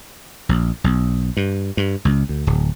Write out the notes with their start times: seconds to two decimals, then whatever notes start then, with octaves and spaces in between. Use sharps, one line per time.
0.49 A#1
0.84 B1
1.37 G2
1.77 G2
2.05 C#2
2.29 D2
2.47 D1